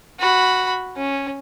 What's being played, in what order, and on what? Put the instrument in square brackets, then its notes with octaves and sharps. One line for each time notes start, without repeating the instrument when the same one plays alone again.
[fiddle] F#4 B5
C#4